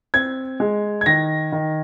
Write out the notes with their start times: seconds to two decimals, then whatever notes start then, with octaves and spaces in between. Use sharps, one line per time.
0.14 C4 G#6
0.60 G#3
1.01 G#6
1.06 D#3 A#6
1.52 D#3